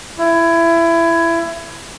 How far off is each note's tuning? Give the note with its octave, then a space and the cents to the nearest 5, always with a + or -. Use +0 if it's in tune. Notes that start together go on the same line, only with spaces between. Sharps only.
E4 +20